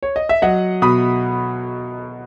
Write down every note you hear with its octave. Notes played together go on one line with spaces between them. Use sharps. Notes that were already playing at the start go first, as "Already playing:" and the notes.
C#5
D#5
E5
F#3 D#5 F#5
B2 B5 D#6